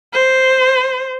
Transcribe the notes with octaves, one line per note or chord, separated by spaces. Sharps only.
C5